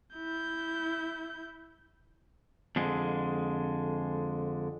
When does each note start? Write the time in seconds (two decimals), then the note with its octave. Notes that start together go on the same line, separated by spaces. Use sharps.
0.17 E4 G6
2.76 F2 D3 G#3